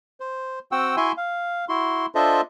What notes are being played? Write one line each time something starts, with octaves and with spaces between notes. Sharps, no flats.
C5
C4 F#4 F#5 G5 E6
E4 F#4 E5 G#5 C6
F5
E4 F#4 C6
D4 F4 A4 C5 D#5 E5